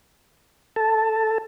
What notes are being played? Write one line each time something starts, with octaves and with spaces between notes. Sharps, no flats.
A4 A5